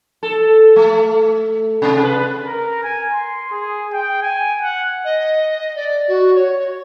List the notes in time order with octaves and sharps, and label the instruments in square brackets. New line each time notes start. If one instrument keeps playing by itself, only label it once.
[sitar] A4
A3
C3
B4
[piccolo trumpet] A#4
G#5
C6
G#4
G5
G#5
F#5
[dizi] D#5
D5
F#4
C#5